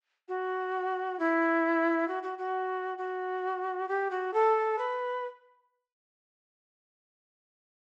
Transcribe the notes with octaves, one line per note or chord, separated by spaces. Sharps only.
F#4
E4
F#4
F#4
F#4
F#4
G4
F#4
A4
B4